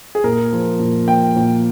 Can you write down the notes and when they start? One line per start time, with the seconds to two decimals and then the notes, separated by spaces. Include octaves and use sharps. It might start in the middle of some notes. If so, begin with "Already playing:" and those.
0.15 G#4
0.24 A#2 A#4
0.53 F3
0.80 A#2
1.08 A#3 G5
1.36 A#2